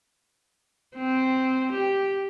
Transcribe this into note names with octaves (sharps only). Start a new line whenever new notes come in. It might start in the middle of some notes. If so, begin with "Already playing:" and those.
C4
G4